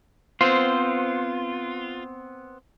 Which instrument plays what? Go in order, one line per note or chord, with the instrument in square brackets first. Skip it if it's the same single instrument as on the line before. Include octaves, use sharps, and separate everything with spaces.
[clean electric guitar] B3 C4 C5 [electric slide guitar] F4